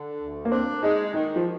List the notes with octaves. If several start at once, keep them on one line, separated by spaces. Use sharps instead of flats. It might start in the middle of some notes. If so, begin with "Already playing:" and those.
Already playing: D3
D2
A#3
C4 D4
G#3 D#4
D#3 D#4
F3